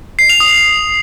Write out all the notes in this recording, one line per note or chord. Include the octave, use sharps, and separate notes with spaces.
C7
F7
D#6